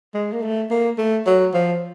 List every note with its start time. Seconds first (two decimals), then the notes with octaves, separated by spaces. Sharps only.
0.14 G#3
0.33 A#3
0.42 A3
0.71 A#3
0.98 A3
1.26 F#3
1.54 F3